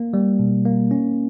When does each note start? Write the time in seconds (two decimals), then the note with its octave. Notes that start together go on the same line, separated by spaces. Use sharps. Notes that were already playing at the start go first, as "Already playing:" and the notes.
Already playing: A#3
0.14 G3
0.39 B2
0.65 A#3
0.91 C#4